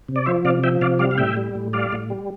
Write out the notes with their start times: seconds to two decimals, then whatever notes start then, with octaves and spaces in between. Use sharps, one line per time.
0.09 C3
0.16 D5
0.26 F3 C5 E5
0.45 C3 D5 F5
0.63 F3 E5 G5
0.81 C3 D5 F5
0.99 G3 D5 F5
1.11 F5
1.18 A2 E5 G5
1.37 G3
1.55 A2
1.73 G3 D5 F5
1.92 A2
2.10 G3